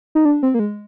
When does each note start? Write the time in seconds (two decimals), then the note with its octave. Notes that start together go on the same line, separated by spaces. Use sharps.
0.15 D#4
0.25 D4
0.43 C4
0.54 A#3
0.59 G#3